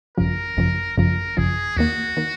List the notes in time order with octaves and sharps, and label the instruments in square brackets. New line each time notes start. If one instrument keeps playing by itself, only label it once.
[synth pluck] G#1 F#2 C#3 F3 [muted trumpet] A#4
[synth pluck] G#1 F#2 C#3 F3
[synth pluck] G#1 F#2 C#3 F3 [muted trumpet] A#4
[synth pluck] G#1 F#2 C#3 F3 [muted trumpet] G#4
[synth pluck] D#2 D#3 A#3 [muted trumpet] F#4
[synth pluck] D#3 A#3